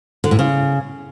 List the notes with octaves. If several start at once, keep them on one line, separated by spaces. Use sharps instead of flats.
D3
A2
C#3